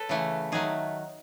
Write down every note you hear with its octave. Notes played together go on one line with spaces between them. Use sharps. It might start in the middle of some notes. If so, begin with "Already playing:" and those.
Already playing: A4 B4 C#5
C#3 E3 A3
D#3 F#3 A3 G#4